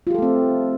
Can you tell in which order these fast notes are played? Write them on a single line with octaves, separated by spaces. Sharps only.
F4 G4 A4 A3 C4